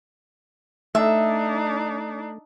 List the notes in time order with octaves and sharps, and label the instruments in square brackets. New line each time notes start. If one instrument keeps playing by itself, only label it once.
[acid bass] A3 [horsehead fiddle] D4 D#4 [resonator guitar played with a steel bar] E5